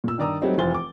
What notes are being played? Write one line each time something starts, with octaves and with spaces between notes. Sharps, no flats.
A#2 E6
G2 D#3 D5 A#5 D#6 E6
F#3 G3 A3 C4 D#4
F1 E3 F4 C5 A6 G7
D6